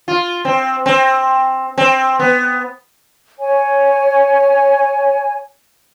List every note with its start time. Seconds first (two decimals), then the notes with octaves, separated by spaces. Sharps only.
0.08 F4
0.45 C4
0.86 C4
1.78 C4
2.19 B3
3.40 C#5 G#5